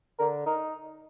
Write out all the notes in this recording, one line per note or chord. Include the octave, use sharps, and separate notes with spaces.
D3 A#4
D#4 A#4